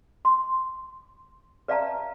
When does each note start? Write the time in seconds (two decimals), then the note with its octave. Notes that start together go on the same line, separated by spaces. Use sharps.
0.25 C6
1.68 B4 D5 E5 F5 A5 A#5